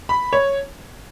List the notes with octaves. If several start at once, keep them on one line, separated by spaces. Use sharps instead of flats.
B5
C#5